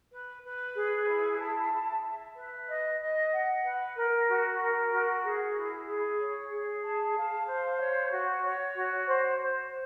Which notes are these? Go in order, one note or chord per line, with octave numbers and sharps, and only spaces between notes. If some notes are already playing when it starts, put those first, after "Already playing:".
B4
B4
G#4
E4
A5
E5
E5
B4
D#5
D#5
F#5
B4
A#4
F#4
A#4
F#4
G#4
E4
G#4
C#5
G#4
A5
F5
C5
C#5
F#4
C#5
F#4
C5
C5